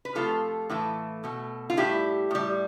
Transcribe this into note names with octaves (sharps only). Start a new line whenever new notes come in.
B4
C3 F3 A3 F4 A4
A2 E3 A3
B2 A3
F4
A2 G3 E4 G4
A2 G3